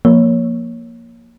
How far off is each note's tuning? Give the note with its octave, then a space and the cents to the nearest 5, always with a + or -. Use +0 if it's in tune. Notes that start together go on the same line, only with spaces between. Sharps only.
F3 +0 A#3 +0 C#5 +0